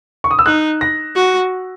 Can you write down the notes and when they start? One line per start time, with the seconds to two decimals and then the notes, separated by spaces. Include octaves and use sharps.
0.24 C#6
0.31 D#6
0.39 E6
0.46 D#4 F#6
0.81 A#6
1.15 F#4